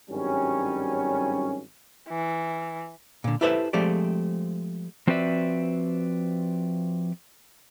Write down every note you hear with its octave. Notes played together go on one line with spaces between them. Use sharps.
G#1 G2 F#3 G3 C#4
E3
A#2 D3
E4 G4 A4 B4 C5 E5
F3 G#3 A3 C4 G4 D5
F3 C4 F#4 B4 D5 E5